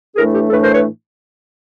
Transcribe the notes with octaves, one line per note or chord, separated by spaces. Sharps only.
A2 E3 A3 D4 G#4 A#4
G4 A4
A2 E3 A3 D4 A4 B4
A#4 C5
B4 C#5